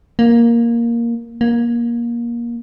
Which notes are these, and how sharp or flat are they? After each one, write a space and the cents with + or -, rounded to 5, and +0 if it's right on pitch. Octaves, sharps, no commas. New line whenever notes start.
A#3 +5
A#3 +20